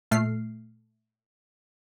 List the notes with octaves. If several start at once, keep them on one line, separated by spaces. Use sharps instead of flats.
A#2 A3 F6 C7